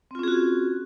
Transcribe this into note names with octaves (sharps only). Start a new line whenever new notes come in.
C4 C#4 F4 F#4 G#4